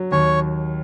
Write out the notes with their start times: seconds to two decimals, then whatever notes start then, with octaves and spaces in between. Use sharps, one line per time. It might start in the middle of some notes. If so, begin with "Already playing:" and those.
Already playing: F#3
0.12 D#2 C#5